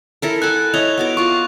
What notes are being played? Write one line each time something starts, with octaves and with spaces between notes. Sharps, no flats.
E4 A4 A#4
A4 F#5 G#5 F#6
E4 C#5 D#5 F7
B3 F#4 D6
F4 C#6 D6